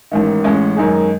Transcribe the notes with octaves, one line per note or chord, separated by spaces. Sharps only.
A1 G#2 D#3
A1 A2 G#3 C#4
F#2 D#3 G#3 D#4 G#4